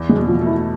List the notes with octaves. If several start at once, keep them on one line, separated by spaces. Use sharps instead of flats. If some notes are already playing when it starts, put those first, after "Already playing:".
Already playing: E2
G#3
B2
F3
A3
E4